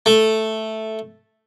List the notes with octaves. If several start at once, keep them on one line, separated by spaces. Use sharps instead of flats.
A3